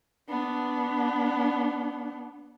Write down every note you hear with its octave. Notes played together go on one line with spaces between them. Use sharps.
B3 D4